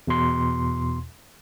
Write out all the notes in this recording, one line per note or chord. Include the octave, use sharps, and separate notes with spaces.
E2 B2 C6